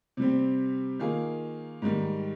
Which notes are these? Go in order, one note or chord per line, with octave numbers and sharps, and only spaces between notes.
C3 G3 C4
D#3 A#3 F4 G#4
G#2 D#3 G3